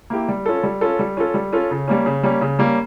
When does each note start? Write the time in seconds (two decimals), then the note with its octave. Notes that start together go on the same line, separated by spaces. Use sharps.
0.10 A#3 E4 G4
0.28 G3
0.46 C#4 F4 A4
0.63 G3
0.81 C#4 F4 A4
0.99 G3
1.17 C#4 F4 A4
1.34 G3
1.52 C#4 F4 A4
1.71 C#3
1.88 G3 A#3 C#4
2.06 C#3
2.23 G3 A#3 C#4
2.41 C#3
2.59 G3 A#3 C#4